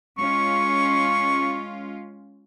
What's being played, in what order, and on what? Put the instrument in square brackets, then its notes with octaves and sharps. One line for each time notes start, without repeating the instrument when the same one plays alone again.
[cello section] G#3 C#4 F4 [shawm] C#6